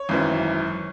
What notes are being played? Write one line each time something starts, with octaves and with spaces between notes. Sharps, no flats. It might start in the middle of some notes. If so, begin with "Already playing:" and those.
Already playing: C#5
G#1 F#2 E3